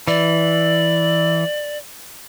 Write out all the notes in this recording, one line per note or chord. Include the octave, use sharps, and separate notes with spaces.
E3 D5